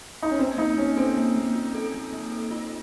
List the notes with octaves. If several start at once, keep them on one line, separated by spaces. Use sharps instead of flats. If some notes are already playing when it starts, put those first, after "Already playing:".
D#4
C#4
A#3 C4
A#3 D#4
A#3 C#4
C4 A4
A#3
A#3
F4
A4
A#3
A#3
A4
F4